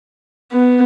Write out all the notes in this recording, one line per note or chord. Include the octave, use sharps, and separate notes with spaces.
B3